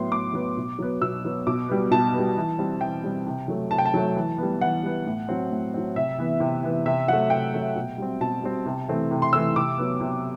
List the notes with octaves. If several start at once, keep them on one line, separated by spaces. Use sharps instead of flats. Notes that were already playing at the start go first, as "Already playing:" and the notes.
Already playing: A2 F#3 B3 C6
A2 D6
F#3 B3
B2
F#3 B3
B2 E6
F#3 B3
B2 D6
G3 B3
B2 A5
G3 B3
E3
G3 C4
E3 G5
G3 C4
C3
F#3 A3
C3 A5
G5
A5
F#3 A3
E3
G3 B3
E3 F#5
G3 B3
A2
F#3 C4
A2
F#3 C4
C3 E5
E3 B3
C3
E3 B3
C3 E5
F#3 A3 F#5
C3 G5
F#3 A3
B2
G3 C4
B2 A5
G3 C4
C3
E3 A3 C4
C3
C6
E3 A3 C4 E6
C3 D6
F#3 B3
C3